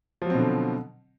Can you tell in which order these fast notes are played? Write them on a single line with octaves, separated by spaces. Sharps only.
F3 F#3 C4 B2 D3